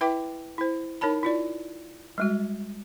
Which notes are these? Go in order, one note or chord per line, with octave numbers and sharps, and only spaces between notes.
E4 B4 E5 G5 D6
E4 C5
D#4 A#4 C#5 A5 B5
E4 F4 D5
G3 G#3 F#4